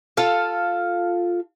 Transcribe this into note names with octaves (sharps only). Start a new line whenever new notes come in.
F4 A4 F5